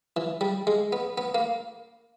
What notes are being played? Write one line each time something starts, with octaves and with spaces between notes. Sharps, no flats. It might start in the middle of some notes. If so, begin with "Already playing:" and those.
E3
G3
G#3
B3
B3
A#3